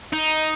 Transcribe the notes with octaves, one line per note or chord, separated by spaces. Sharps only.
D#4